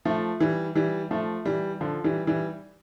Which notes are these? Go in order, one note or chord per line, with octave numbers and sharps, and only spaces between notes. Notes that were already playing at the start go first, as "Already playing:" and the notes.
F3 A3
E3 G3
E3 G3
F3 A3
E3 G3
D3 F3
E3 G3
E3 G3